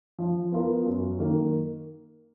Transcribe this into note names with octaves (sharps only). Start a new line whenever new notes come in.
F3
B3 F4 A#4
F#2
D#3 A#3